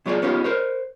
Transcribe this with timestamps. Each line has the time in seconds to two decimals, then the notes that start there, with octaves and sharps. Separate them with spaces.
0.06 B2 F#3 E4 F4 G#4 D5
0.22 B3 C#4 D#4 F4 G4
0.44 A#4 C5 C#5